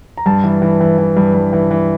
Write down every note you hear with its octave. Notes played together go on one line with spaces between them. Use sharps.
A#5
G2 A5
E3
E3
E3
E3
G2
G2
E3
E3